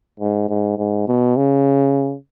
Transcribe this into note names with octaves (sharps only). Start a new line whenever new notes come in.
G#2
G#2
G#2
B2
C#3